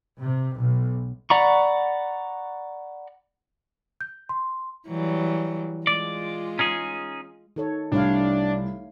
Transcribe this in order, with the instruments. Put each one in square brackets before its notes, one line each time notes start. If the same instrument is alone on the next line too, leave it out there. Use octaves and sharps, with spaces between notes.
[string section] C3
B1
[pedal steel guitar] D5 F#5 A#5 B5 C#6
[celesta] G6
C6
[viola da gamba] E3 F#3 G3
[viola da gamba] G#3 F4 [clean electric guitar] D5
[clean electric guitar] C#4 D#4 G#4
[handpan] D#3 A4 C#5
[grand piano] C2 [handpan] A3 C#5 F5 [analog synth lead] D4